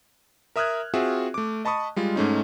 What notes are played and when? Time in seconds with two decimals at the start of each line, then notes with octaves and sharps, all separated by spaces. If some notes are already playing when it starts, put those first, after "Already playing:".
0.56 A#4 E5 D#6 F6 F#6 G#6
0.94 C4 F4 F#4 G#4 E5
1.34 A3 D6
1.65 D#5 A5 B5 C#6 D#6
1.96 G3 G#3 F4
2.16 G#2 A3 C#4 D#4